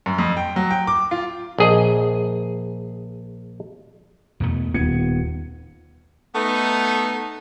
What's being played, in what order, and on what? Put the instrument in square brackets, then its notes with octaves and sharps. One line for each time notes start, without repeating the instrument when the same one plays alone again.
[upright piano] F#2
F2
G5
F#3
G5
D6
F4
[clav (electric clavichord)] A#1 G#4 D#5
[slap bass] E2 B2 A3
[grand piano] D#1 G#6 C#7 [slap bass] B3
[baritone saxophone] A3 [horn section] B3 D#4